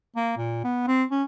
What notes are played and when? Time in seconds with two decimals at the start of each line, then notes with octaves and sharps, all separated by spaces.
0.16 A#3
0.37 A#2
0.64 B3
0.87 C4
1.11 C#4